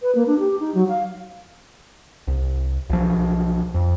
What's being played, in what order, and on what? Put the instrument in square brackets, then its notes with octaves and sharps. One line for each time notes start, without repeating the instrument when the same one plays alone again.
[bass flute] B4
A#3
D4
G4
D#4
F#3
F5
[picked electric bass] C2
B1 F3
F2